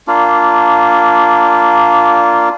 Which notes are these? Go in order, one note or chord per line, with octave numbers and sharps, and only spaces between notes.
A#3 D4 F4